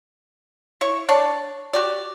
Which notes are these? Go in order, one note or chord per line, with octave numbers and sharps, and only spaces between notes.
E4 C#5 C#6
D4 C#5 D5 A5
F#4 G4 D5